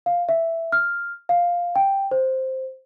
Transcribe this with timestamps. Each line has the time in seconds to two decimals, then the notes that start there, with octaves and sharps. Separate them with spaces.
0.06 F5
0.29 E5
0.72 F6
1.29 F5
1.76 G5
2.11 C5